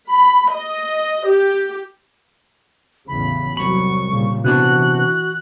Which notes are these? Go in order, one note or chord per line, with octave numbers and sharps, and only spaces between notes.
B5
D#5
G4
A1 E2 C#3 B5
C2 F#3 B5 C#6
A#2 C#3 G3
C3 E3 B3 D4 F#4 F#6